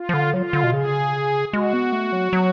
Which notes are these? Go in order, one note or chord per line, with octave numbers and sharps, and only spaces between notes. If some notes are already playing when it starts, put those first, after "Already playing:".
Already playing: F4
F3
D3
F#3 F4
D3
B2
C#3 G#4
G#3 F#4
B3
A3
F#3
F#3